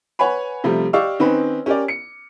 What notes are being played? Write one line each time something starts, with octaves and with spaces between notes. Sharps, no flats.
B4 C#5 F#5 G#5 B5
C3 F3 G3 A3
G4 D5 D#5 F5 C#6 E6
D#3 C4 C#4 D#4 B4
C#4 G4 A#4 D5
C#7